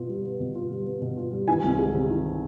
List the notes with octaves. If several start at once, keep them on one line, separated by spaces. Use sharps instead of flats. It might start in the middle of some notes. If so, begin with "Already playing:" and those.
Already playing: B2 B3 F4
G3
B3
B2
F4
G3
B3
B2
F4
G3
D#3 G#5
C2
G#3
C3
D#3